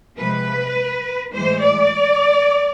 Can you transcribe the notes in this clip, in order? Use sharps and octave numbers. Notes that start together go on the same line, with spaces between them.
C3 F3 G#3 B4
A2 E3 G#3 C5
D5